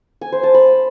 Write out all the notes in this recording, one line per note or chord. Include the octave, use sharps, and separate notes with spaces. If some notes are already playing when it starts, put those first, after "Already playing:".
G#5
C5
A5
B5